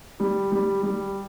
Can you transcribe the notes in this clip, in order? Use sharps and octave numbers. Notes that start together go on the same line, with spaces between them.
G3
G3
G3